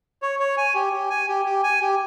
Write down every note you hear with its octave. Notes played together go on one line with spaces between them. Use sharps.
C#5
C#5
G#5
G4
G4
G#5
G4
G4
G#5
G4